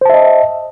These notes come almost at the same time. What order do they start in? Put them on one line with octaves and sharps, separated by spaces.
C5 A5 E5 D#5